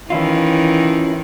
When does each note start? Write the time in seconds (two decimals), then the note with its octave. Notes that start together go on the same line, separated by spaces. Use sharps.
0.10 D#3 E3 C#4 E4 F4